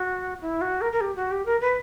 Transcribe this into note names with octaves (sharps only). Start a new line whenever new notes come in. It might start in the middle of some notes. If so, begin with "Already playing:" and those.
Already playing: F#4
E4
F#4
A#4
A#4
G4
F#4
G4
A#4
B4